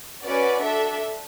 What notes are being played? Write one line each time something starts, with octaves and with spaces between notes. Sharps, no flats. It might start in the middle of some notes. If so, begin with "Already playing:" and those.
C#4 F#4 B4 D5
D4 A4 E5